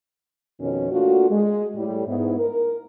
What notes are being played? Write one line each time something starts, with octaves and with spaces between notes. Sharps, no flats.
F2 B2 D#3 C#4
A3 A#3 D4 F4 F#4
G#3
A2 G3
G#2 B3 E4
A#4